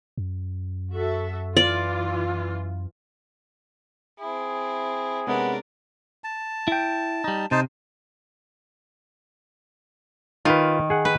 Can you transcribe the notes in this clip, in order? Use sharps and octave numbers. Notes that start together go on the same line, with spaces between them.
F#2
F#4 A4 E5
E3 F4 D5
C4 E4 G#4
C3 G#3 B3 C#4 D4 A#4
A5
E4 G5
G3 D#4
C3 D#4 C5 A5
D#3 F4 B4
G#4 F#5
B4